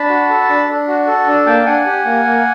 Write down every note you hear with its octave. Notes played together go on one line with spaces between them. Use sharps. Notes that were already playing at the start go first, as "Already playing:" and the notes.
Already playing: D4 A5 B5
F#4
A4
D4
D4
F#4
A4
D4
A#3 G5 A5
D4 F#5 G#5
G4
A#3
A#3